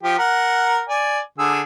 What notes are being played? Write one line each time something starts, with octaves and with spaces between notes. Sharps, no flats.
F3 G4
A#4 F#5
D5 G#5
D3 G#4 E6